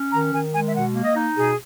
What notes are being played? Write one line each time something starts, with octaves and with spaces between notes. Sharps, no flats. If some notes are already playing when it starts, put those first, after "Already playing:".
Already playing: C#4
D#3 A#5
D#3 G#5
G#3 G#5
E5
B2 F#5
A#3
D#5
D#4
B2 G#4